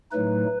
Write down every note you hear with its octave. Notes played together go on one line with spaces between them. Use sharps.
A2 F#3 A3 D#4 B4